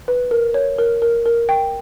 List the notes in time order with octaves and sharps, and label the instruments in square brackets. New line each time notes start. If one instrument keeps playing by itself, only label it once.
[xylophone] B4
A#4
C#5
A#4
A#4
A#4
G5